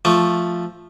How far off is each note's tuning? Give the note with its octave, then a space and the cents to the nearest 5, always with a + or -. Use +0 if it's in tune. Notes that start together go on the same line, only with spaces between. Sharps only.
F3 +0 A3 +0 C#6 +35